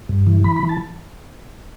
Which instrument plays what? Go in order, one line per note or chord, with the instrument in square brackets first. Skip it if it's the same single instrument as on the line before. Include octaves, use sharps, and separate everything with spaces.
[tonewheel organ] G2
E3
E3 B5
B5
E3
A5